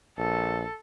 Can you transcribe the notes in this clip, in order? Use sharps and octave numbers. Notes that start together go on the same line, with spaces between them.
A#1 A4